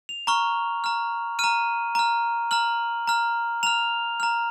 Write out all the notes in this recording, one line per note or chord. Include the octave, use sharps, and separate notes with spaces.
F7
A#5 C#6 F6
A#5 F6
A#5 F6 D#7
A#5 F6
A#5 F6 F#7
A#5 F6
A#5 F6 F7
A#5 F6